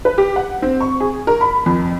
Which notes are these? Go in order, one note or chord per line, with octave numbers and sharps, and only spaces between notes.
B4
G4
F#5
C4
C#6
G#4
A#4
B5
F2